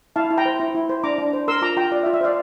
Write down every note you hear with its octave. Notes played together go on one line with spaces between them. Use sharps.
E4 F5 A5
E4
G5 A#5
C5
E4
E4
C5
D4 A#5 D6
D4
C5
A#4 C6 E6
F4 A#5 D6
F4 G5 A#5
F4 D5
E5
F4
E5
C5 D5 F5